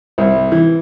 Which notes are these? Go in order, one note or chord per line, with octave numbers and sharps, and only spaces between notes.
C2
E3